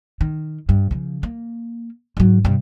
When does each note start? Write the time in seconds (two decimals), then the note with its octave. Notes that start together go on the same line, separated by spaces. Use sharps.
0.21 D#3
0.69 G2
0.91 C#3 F3
1.23 A#3
2.17 G#2 F#3
2.45 G2 C3